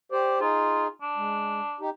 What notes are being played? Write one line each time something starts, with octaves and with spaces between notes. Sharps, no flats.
G4 C5 D5
D#4 F4 G#4
D4
G#3
D#4 G4